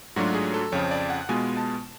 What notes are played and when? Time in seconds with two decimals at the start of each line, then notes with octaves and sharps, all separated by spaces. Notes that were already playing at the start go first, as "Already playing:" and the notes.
0.16 G#2 F#3 A3 D4 F4 F#4
0.34 G#4
0.54 A4
0.72 F2 C#3 F3 C#5
0.91 D5
1.10 F#5
1.29 B2 G#3 B3 F4 G#5
1.57 A5